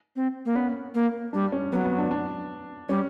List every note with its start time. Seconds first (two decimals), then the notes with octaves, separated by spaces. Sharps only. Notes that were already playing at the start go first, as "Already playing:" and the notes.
0.16 C4
0.45 A#3
0.55 B3 C#4
0.95 A#3
1.33 G3 D4
1.52 C#4
1.72 F#3 B3
1.85 B3
1.99 D4
2.11 D4
2.89 G3 C#4